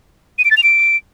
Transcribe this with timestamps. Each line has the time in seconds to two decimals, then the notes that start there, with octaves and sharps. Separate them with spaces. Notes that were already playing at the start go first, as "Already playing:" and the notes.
0.38 D#7
0.45 D7
0.51 A6
0.57 F7
0.63 D7